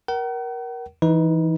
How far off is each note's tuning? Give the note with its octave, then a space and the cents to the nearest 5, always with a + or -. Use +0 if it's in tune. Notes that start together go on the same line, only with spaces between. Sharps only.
A#4 +20 F#5 +45
E3 +0 D#4 +25 B4 +0